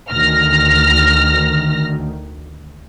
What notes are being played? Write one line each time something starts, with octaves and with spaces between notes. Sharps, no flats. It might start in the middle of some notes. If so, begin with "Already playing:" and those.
D2 D#3 F6 A#6